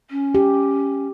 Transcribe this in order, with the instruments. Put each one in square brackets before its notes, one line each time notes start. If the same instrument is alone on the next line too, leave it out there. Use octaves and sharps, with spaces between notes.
[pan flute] C#4
[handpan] G4